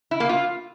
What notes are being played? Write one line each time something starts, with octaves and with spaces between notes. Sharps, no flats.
E4
A#3
F4